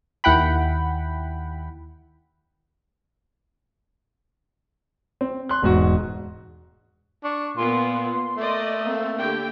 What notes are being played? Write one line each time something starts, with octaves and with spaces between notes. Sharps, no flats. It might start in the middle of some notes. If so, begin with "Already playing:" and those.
D#2 E4 F#5 G5 B5
C4
C6 F#6
E1 G#2 F#4
D4 C#6
A#2 A#3 B3 C6
A3 A#3 D5 D#5
A#3 C4 A4
D3 G4 G5